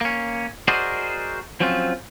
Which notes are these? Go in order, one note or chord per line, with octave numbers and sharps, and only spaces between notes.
A#3 C#4
F#4 G#4 A#4 C5 D5 D#5
F3 F#3 C4 C#4 F4